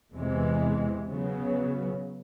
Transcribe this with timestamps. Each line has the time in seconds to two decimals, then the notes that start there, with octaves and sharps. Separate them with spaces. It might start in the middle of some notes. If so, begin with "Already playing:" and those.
0.14 E2 C3 E3 G#3
1.09 C#3 F#3 B3